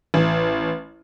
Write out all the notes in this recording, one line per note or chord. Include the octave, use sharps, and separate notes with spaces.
A1